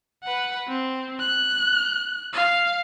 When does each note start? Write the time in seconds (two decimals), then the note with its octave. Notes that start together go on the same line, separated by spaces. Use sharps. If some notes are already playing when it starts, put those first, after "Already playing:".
0.24 B4 F#5
0.68 C4
1.20 F#6
2.33 F5